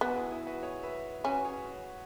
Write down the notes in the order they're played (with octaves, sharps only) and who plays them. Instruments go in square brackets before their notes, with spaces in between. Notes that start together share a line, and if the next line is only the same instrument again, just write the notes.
[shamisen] B3 [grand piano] F#4
[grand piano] B4
E4 G#4
E4 G#4
F#4 B4
G#4 C#5
B4 E5
[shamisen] C#4 [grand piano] F#4 B4
[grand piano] G#4 C#5